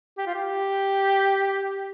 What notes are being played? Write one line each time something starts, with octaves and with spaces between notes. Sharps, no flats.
G4
F4
G4